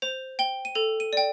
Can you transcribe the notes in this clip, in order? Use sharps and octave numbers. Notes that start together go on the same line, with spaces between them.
C5 F7
G5 G7
D#7
A4 F7
D#7
D5 G5